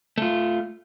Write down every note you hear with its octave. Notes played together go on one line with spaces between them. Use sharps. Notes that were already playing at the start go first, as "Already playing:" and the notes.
A3 F4